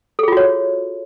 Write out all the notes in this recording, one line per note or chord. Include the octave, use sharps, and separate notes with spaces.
F4 F#4 G#4 A4 C#5